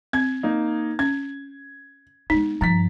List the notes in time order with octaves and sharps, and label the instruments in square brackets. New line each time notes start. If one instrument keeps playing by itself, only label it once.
[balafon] C4 [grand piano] G#6
[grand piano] A#3 D#4
[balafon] C#4 [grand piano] G#6
[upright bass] G#3 B3 [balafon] D#4
[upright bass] G2 F3 [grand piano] A#5 A6 B6